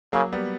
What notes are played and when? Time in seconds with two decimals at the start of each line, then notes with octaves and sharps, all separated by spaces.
0.13 C#3 F#3 A#3
0.32 G3 B3